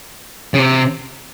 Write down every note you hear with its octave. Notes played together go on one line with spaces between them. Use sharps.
C#3
C3